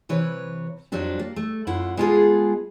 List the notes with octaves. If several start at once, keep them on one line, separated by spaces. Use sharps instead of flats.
C3 E3 B4 C#5
F2 F3 F#3 D4 G4
A#3
A3
F#2 E4 F4 F#5
G#3 B3 F4 F#4 G#4 A4